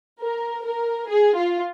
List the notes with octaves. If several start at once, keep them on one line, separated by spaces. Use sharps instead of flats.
A#4
A#4
G#4
F4